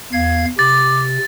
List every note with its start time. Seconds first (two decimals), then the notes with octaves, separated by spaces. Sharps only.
0.13 E2 F5 G#6
0.59 C3 D6 A6